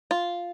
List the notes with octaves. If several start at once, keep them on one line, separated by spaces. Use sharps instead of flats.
F4